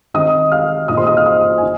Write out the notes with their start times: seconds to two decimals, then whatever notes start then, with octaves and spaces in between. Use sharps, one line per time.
0.14 D#3 C4 D#4 D#5 D#6
0.52 F5 F6
0.88 A#2 A#3 D#4 D#5 D#6
0.97 C5 C6
1.07 D#5 D#6
1.17 F5 F6
1.25 D#5 D#6
1.58 G#5
1.62 D#4